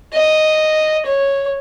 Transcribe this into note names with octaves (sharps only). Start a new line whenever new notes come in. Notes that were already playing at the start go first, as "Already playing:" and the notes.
D#5
C#5